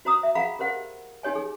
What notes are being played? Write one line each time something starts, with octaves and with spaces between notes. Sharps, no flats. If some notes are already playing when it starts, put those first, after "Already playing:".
F#4 C5 A#5 D#6 E6
E5
G#4 F5 F#5 A#5 B5
G4 A#4 C5 F#5
D#4 G4 C#5 G#5
G#4